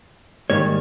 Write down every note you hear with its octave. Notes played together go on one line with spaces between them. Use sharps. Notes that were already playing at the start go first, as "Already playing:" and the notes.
G#2 D#3 G3 A#3 C#5